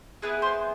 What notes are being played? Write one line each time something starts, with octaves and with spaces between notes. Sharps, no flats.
B3 E4 G#4 B4
C5